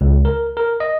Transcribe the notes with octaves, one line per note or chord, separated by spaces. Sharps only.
C#2
A#4
A#4
D#5